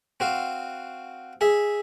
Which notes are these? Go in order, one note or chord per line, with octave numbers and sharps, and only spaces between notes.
C4 F#4 F5
G#4 E5